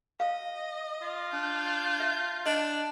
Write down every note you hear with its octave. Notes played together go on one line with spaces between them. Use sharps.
D#5 F5
F4
D4 G6
E5
D4 D#5